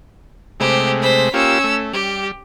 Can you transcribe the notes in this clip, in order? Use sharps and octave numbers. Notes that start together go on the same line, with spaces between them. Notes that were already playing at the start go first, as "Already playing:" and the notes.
C3 G#3 A3 G4 C5
C5 B6
A#3 C#4 F4 G4 E6
A3
G3 G4